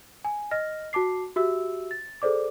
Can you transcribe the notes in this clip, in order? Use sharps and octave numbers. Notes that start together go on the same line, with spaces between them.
G#5
D#5 F6 A#6
F#4 A5 D6 C7
F#4 G4 E5 E6
A6
G#4 A4 C5 D5 D6